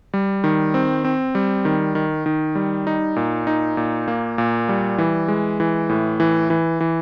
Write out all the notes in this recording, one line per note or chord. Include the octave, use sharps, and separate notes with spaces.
G3
D#3
C4
C4
G3
D#3
D#3
D#3
G3
D#4
A#2
D#4
A#2
A#3
A#2
G3
E3
G#3
E3
A2
E3
E3
E3